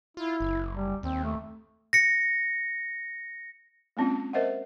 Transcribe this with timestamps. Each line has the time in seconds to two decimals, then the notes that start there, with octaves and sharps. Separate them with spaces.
0.17 E4 F4
0.40 F#1
0.74 G3
1.03 D#2 C4
1.24 A3
1.93 A#6 C#7
3.97 G#3 A#3 C4 C#4 F4
4.33 A#4 C5 D#5 E5 F#5